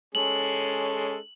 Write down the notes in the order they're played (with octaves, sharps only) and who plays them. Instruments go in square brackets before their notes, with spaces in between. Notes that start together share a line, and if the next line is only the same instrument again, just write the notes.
[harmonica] G#3 C#4 A4 [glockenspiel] F#7